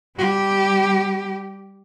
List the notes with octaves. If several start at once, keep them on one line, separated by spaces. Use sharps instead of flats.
G3 G4